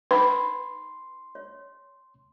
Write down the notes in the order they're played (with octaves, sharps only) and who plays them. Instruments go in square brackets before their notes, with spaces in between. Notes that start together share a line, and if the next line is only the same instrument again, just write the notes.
[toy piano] D#4 B5 [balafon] B4 [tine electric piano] C6
[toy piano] C#5